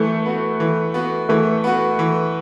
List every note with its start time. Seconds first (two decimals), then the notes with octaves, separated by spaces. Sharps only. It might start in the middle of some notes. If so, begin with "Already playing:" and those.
Already playing: E3 A3
0.25 B3 F#4
0.60 E3
0.94 B3 F#4
1.29 E3 A3
1.64 B3 F#4
1.99 E3